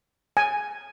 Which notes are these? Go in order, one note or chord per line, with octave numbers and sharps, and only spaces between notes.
G#5